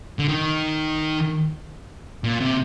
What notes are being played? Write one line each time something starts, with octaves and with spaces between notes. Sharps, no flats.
D3
D#3
A#2
C3